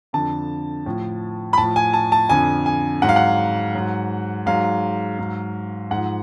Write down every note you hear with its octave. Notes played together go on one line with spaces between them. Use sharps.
F2 D3 F3 A5
A2 F3
B5
A2 F3 A5
G#5
A5
A5
F2 D3 F3 G#5
G#5
G#2 F#3 F#5
F5
F#5
G#2 F#3
G#2 F#3 F5
G#2 F#3
G#2 F3 F#5